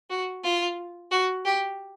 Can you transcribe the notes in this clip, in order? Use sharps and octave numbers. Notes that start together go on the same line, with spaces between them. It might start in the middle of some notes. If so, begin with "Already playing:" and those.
F#4
F4
F#4
G4